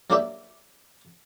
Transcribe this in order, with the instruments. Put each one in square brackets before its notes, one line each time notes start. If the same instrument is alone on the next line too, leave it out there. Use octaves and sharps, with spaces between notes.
[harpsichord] F#3 A#3 D4 G4 E5